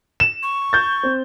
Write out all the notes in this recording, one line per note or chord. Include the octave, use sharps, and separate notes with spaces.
E7
C#6
G6 A6
C4